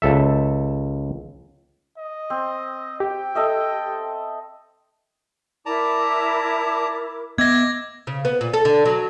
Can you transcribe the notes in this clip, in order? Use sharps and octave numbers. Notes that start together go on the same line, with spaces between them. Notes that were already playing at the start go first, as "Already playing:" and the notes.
C#2 A4 E5
D#5
C4
G4 G5
A4 D#5 E5
E4 A#4 D5 A5 A#5 D6
B3 D#5 E5 D6 G#6 A#6
C#3
B3
A#2
A4
D3
F#3